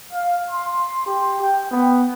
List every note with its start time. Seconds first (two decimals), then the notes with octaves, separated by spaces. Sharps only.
0.13 F5
0.50 C6
1.06 G4
1.42 G5
1.71 B3